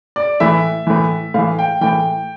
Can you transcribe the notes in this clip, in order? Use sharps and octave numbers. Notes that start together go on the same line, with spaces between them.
D5
A2 E3 E5
A2 E3
A2 E3 F5
G5
A2 E3 G5